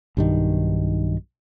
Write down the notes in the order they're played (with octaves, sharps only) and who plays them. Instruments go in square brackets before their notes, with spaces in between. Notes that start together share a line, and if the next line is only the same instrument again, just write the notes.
[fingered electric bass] B1 G2 D#3